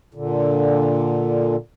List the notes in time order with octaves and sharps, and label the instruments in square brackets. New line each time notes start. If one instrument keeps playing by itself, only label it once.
[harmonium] A#2 D3